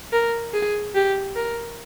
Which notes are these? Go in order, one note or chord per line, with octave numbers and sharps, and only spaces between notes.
A#4
G#4
G4
A#4